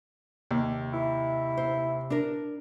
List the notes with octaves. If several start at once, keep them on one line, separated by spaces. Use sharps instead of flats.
D#2 C3
E4
C5
D4 A#4